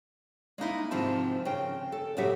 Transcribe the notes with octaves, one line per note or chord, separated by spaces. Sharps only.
G#3 A#3 D#4 E4
G#2 C3 D#3 F3 C4 A5
C#3 A#4 G5
A4
A2 C#3 F#3 F#4 G4 E5